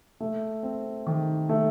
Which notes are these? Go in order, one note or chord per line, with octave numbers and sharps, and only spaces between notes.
A3
C4
D#3
A3